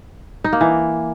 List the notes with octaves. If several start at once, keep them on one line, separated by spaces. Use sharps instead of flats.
D#4
A#3
E3